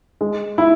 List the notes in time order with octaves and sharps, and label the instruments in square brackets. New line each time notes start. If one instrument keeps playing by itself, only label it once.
[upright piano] G#3
E4